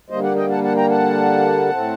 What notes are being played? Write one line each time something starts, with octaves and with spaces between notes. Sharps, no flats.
D3 G3 A#3 C5 D#5
D5 F#5
D#5 G5
F#5 A5
F#5 A5
G5 A#5
F#5 A5
A2 A3 C4